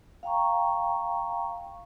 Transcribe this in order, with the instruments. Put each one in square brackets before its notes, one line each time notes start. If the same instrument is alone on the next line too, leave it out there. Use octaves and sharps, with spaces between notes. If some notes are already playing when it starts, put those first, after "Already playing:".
[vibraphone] F5 G5 A#5 C#6